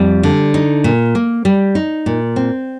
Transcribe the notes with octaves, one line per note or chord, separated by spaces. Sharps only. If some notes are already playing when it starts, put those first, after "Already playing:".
Already playing: F2 G3
D3
D#4
A#2
A#3
G3
D#4
A#2
C4